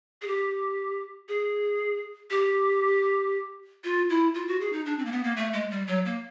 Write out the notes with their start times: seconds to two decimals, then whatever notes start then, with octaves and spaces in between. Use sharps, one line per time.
0.22 G#4
0.27 G4
1.29 G#4
2.31 G4
3.84 F4
4.09 E4
4.34 F4
4.48 F#4
4.61 G#4
4.73 D#4
4.86 D4
4.99 C4
5.05 A#3
5.12 B3
5.24 A#3
5.36 A3
5.53 G#3
5.71 G3
5.87 F#3
6.05 A#3